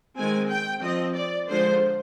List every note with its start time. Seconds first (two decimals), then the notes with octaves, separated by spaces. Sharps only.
0.18 D#3 G#3 C4 G#5
0.50 G5
0.83 F3 C4 D#5
1.16 D5
1.48 D3 F3 G#3 C5